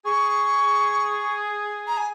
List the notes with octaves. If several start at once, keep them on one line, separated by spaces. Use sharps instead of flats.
G#4 C#6
A#5
G#5